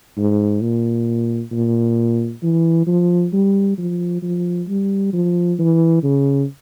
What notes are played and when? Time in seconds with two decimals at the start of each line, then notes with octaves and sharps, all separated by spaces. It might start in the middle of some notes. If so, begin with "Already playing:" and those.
0.17 G#2
0.61 A#2
1.52 A#2
2.43 E3
2.87 F3
3.33 G3
3.78 F3
4.22 F3
4.68 G3
5.13 F3
5.59 E3
6.03 C#3